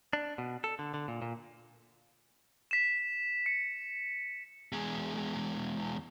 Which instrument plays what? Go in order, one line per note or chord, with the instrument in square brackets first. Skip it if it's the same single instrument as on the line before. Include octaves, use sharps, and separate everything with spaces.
[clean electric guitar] D4
B2
A4
D3
D3
A#2
A#2
[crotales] B6 E7
C#7
[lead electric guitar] E2 G#3